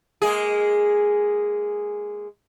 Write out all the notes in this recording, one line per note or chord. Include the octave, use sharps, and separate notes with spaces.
G#3 A#3 G#4